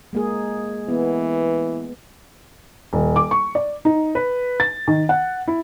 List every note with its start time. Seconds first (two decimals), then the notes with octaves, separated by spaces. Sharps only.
0.13 G#3 A#3 G#4
0.89 E3 B3
2.93 D#1
3.16 D6
3.31 C#6
3.55 D5
3.85 D#4
4.15 B4
4.60 A6
4.88 D#3
5.09 F#5
5.48 E4